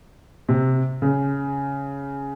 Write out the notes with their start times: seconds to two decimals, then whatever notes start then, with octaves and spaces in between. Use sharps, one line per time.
0.49 C3
1.02 C#3